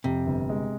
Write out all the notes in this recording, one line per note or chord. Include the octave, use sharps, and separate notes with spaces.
F2 C3
G1
G#3